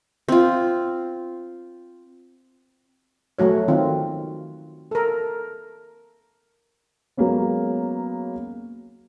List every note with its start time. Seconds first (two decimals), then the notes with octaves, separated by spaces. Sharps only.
0.28 C4 F4
3.39 F#3 A3 F#4 C#5
3.68 D#3 C4 F4
4.91 A4 A#4
7.17 F#3 G#3 A#3 B3 C#4